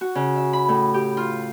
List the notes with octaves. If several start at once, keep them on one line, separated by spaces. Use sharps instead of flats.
F#4
C#3
E5
B5
A2
G4
F4